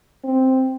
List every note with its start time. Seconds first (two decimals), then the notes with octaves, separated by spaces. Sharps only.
0.24 C4